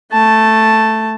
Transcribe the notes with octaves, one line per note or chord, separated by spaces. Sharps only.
A3 A5